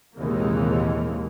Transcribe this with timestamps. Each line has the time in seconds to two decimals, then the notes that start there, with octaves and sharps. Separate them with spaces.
0.17 A#1 D#2 C3 E3 G#3 A#3